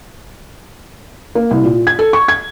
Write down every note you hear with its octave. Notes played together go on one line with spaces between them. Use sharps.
A#3
C2
A#2
G#6
A4
C#6
G#6